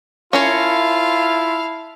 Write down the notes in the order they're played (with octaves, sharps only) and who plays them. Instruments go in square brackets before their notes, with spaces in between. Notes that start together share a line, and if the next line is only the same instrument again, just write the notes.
[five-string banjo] C#4 A#4 C#5 [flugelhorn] E4 [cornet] F4 [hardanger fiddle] F5 A5